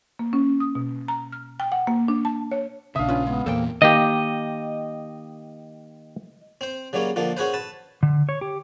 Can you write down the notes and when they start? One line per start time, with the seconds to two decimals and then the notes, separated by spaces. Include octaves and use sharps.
0.19 A#3
0.33 C#4
0.60 D#6
0.75 B2
1.08 A#5
1.32 F6
1.60 G5
1.72 F#5
1.87 A#3
2.08 D4
2.25 A5
2.51 C#5
2.96 A#1 C#3 D4 E5 F5 D#6
3.08 C#4 F4 B4
3.27 G#3 B3
3.46 E2 A#2 A#3 A4 C5 G5
3.82 D#3 A#3 G4 D#5
6.61 C4 C5
6.93 C#3 F#3 G3 A#3 C#4
7.16 D3 F3 A#3 F4
7.37 C#4 F#4 G#4 B4 C5
7.54 B4 A5
8.03 D3
8.29 C#5
8.41 G4